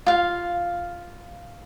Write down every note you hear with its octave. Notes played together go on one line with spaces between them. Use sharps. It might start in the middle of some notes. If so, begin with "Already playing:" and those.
F4 F5